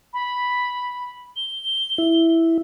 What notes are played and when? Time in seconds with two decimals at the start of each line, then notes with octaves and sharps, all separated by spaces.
0.13 B5
1.36 G7
1.98 E4